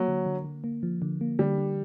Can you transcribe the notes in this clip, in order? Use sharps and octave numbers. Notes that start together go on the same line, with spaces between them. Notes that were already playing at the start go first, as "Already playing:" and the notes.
Already playing: F#3 A#3
D3
D3
D3
A#3
F3
D3
A#3
D3 G3
D3